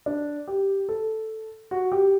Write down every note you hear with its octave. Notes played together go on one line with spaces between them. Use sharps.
D4
G4
A4
F#4
G4